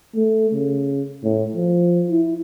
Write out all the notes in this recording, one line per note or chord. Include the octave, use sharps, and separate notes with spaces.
A3
C#3
A2
F3
E4